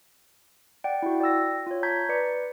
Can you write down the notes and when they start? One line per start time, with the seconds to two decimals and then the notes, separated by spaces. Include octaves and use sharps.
0.84 D5 F#5 G5
1.02 E4 F#4
1.21 D5 G5 E6 A#6
1.67 F4 C#5
1.83 A5 A#5 C#6 G6 G#6 B6
2.09 B4 D5 C#7